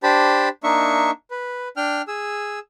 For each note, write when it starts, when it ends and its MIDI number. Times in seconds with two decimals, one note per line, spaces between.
0.03 0.49 62
0.03 0.49 67
0.03 0.49 72
0.03 0.49 81
0.03 0.49 83
0.64 1.11 58
0.64 1.11 62
0.64 1.11 63
0.64 1.11 76
0.64 1.11 85
1.31 1.68 71
1.77 2.02 62
1.77 2.02 79
1.77 2.02 89
2.08 2.59 68
2.08 2.59 88